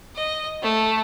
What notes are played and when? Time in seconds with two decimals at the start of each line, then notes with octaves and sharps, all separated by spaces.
0.16 D#5
0.62 A3